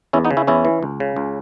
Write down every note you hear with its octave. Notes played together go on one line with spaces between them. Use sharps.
E2 C#4 E4
B3 D#4
C#3
C#4 E4
E2 C#4 E4
E3
C#2
C#3
C#2